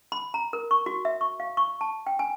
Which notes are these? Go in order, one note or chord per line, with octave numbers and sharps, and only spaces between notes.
B5
A#5
A#4
C#6
F#4
E5
C#6
F5
C#6
A5
G5
G#5